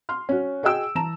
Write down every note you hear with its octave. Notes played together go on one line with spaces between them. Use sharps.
C6 F6
C#4 F#4
F#4 G#4 D#5 G5 E6 D7
E3 A5 A#5 E7